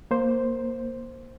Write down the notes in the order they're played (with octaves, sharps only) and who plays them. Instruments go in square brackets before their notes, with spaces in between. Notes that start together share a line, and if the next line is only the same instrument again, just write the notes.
[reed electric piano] A#3 C5